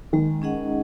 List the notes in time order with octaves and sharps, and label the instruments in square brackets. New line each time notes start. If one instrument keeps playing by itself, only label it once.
[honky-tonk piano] D#3 [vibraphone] G#3
[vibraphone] C#4 G#4 D#5 F#5